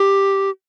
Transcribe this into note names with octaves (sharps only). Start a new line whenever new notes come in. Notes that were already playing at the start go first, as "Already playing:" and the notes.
Already playing: G4